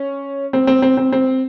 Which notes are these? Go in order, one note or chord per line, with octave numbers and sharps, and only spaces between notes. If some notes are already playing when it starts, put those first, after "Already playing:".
Already playing: C#4
C4
C4
C4
C4
C4